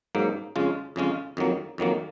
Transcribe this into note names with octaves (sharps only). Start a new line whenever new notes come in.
G#2 F#3 A#3
F2 C#3 G#3 C#4 F4
F2 C#3 G#3 C#4 F4
F2 D#3 F#3 A#3
F2 D#3 F#3 A#3